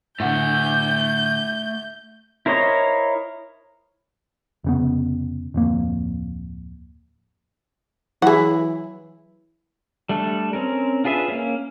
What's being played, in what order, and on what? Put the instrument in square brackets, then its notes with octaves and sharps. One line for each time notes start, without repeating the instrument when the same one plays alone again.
[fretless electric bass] A2 D3 [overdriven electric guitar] A3 F#5 [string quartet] G6
[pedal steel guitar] E4 A#4 C5 C#5 D#5
[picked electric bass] F1 C#3 B3
D1 F2 A#3
[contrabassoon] E3 [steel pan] F#3 E4 [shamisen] G#4 F#5
[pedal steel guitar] G3 A3 D4 A4
C4 C#4 A#4
D4 F4 G#4 B4 E5
A#3 C#4